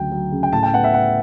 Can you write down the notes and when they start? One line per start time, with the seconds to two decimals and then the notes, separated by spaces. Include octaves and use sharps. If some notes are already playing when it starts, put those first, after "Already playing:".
Already playing: D2 C#3 F#3 G5
0.12 F#3
0.32 C#3
0.43 G5
0.53 A2 A5
0.63 G5
0.73 B3 F#5
0.84 E5
0.94 B3 F#5